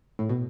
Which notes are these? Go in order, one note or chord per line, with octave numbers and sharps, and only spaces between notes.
A2
B2